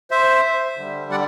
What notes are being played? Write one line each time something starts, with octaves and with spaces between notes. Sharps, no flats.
C5 E5
D3 G3
D5 F#5